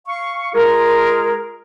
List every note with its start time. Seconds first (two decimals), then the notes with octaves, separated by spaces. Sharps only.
0.07 F5 C#6
0.54 G#3 F4 G#4 A#4